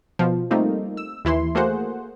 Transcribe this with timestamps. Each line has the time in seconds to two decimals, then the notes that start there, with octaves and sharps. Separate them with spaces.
0.19 B2 F3
0.51 G3 A3 A#3 C4 D#4 F4
0.97 E6
1.25 D#2 E3 E4 C6
1.55 A3 A#3 F#4 G#4 C5 F#5